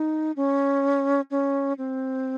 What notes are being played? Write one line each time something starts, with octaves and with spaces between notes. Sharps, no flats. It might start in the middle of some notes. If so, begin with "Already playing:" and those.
Already playing: D#4
C#4
C#4
C4